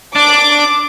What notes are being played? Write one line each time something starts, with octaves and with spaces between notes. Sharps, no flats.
D4 D6